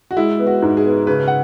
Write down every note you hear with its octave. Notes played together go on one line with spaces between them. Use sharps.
F#4
G#3 E4
B3
F#4
G#2
G#4
B3
C#3 B4
F#5